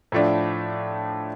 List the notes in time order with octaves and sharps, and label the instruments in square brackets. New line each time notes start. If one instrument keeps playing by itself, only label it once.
[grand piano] A2 F3 A3 D4